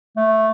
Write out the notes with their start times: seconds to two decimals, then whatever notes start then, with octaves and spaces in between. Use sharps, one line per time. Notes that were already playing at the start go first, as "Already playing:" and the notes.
0.17 A3